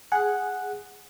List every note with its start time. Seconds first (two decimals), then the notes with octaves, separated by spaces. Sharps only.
0.12 G#4 F#5 F#6